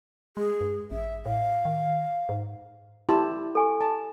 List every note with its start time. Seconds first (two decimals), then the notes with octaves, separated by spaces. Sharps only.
0.37 G#3 G#4
0.61 G2
0.91 A1 E5
1.26 A2 F5
1.65 D#3
2.29 G#2
3.09 E4 G4 A5 C6
3.55 A4 G#5 C#6
3.81 A5